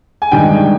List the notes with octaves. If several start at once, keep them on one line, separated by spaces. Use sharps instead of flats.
G#5
G2 D#3 G#3 G5